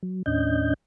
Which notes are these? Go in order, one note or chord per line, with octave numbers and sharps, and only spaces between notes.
F#3
D#2 A2 C#4 D4 D#5 G6